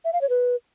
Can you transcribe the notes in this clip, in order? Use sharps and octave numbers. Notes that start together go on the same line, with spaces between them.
E5
F5
C#5
B4